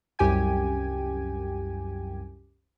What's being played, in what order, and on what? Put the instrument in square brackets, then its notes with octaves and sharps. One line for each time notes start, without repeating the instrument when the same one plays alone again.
[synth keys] C2 F#2 G4 G5 G#5 G#6